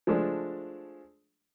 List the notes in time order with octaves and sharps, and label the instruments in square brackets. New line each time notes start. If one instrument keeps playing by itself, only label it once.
[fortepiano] F3 G#3 A3 D4